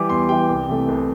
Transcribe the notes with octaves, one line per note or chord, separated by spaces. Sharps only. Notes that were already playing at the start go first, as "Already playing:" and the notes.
Already playing: E3 G3 D6
E2 C6
E3 G3 G5
C2
C3 E3 A3
C2